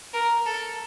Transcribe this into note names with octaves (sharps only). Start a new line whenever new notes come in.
A#4
A4